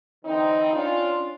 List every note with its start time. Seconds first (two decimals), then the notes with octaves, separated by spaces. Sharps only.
0.24 D3 E3 C4 D#4
0.73 C#4 D4 F4